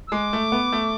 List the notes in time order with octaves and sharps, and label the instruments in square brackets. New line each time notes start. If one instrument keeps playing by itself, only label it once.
[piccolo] E6
[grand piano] G#3 [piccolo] D6
[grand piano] A3
B3
A3